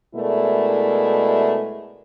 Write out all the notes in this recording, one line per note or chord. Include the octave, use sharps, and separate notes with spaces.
B2 G#3 A3 E4 A#4 D5